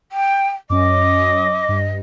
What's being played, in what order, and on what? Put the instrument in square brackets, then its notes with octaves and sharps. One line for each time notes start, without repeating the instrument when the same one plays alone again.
[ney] G5
[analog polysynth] F#2 C#4 [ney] D#5 [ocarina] D6
[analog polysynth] G2